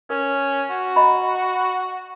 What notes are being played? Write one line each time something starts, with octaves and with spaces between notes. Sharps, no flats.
C#4 A#4
F#4
D#5 A#5 B5